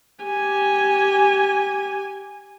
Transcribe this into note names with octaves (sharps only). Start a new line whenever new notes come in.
G4 G#5